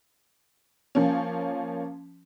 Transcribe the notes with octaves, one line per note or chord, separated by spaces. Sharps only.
F3 A#3 C#4